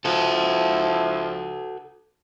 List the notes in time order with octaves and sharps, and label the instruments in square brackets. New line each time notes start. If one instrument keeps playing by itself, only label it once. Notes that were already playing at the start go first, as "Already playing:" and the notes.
[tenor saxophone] F3 [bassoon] E4 [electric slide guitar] F#4 A4